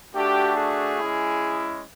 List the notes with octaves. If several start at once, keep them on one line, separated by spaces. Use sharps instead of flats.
A3 D4 F#4 G4
G#4
G#3 C#4 E4